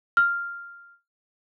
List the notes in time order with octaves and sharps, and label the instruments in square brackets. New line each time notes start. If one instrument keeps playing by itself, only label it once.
[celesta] F6